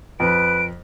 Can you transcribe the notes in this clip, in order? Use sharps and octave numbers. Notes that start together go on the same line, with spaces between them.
F2 B4 D7